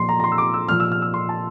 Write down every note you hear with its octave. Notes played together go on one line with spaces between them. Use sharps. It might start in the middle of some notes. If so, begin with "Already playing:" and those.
Already playing: A#2 F3 C6
A#5
A#5
C6
E6
D6
E6
A#2 F3 F6
E6
F6
E6
C6
A5